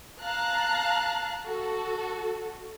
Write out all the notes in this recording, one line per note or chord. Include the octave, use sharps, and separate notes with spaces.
F5 A5 A#5 F#6
F#4 A4